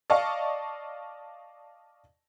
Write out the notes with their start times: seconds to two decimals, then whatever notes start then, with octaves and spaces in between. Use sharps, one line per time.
0.10 D5 D#5 F5 A5 C#6